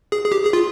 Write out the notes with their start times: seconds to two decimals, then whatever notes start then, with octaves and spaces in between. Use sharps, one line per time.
0.12 G#4
0.25 G#4
0.32 G4
0.45 G#4
0.53 F4